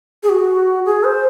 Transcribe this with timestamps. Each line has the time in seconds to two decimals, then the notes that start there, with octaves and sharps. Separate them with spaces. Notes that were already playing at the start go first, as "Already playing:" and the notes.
0.23 G#4
0.29 F#4
0.85 G#4
1.04 C5